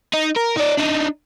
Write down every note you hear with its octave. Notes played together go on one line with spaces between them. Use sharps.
D#4
A#4
D#4 D5
D4 D#4